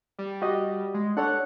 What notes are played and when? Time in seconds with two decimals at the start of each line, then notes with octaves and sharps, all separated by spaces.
0.19 G3
0.42 F#4 G4 D#5
0.94 G#3
1.17 D4 A4 C#5 F#5